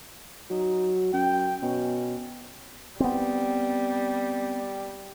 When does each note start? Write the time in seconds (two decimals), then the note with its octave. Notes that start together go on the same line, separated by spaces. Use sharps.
0.50 F#3 D#4
1.13 F#2 G5
1.63 B2 C#4
3.00 G3 B3 C4